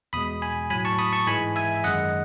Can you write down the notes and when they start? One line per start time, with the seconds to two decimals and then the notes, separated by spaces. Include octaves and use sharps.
0.13 E2 B2 G#3 B5 D#6
0.42 G#5 B5
0.70 A2 F#3 G#5 B5
0.85 A5 C#6
0.98 B5 D#6
1.13 A5 C#6
1.27 G#2 E3 G#3 G#5 B5
1.56 E5 G#5
1.84 F#2 D#3 G#3 D#5 F#5